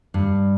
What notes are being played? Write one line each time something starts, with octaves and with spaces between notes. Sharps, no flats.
G2